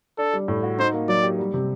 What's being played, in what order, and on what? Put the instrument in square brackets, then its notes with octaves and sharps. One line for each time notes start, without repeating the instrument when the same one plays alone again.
[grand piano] D4 [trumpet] A4
[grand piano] G3
A2
F#4
[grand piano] D#4 [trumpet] C5
[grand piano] A#3
[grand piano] F#3 [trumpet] D5
[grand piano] G4
G3
C3